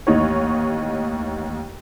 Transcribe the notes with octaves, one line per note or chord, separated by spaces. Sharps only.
A1 D#2 D#4 C#5